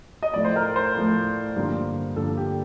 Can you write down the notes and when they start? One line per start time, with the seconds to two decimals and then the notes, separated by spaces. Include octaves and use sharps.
0.23 D#5
0.34 A2 F3 A3 D5
0.45 C5
0.56 A#4
0.76 C5
0.96 A2 F3 A3
1.56 G2 D3 F3 A#3
2.16 G2 D3 F3 A#3 A4
2.37 G4